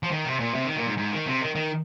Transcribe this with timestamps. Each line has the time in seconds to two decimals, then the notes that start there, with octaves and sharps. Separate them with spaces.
0.03 F3
0.11 D#3
0.26 C3
0.40 A#2
0.55 C3
0.66 D#3
0.77 A#2
0.87 G#2
0.98 G#2
1.12 D#3
1.27 C3
1.41 D#3
1.55 D#3